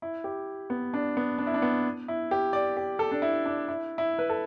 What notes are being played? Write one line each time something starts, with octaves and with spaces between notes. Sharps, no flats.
E4
G4
B3
D4
B3
D4
E4
D4
B3
E4
G4
D5
G4
A4
D4
E4
D4
E4
E4
B4
A4